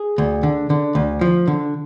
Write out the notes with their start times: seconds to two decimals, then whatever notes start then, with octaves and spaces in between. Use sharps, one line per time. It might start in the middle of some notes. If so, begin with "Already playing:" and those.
Already playing: G#4
0.18 D2
0.43 D3
0.70 D3
0.95 D2
1.21 F3
1.47 D3